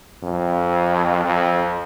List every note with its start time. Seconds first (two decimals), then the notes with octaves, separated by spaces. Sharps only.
0.23 F2
1.25 F2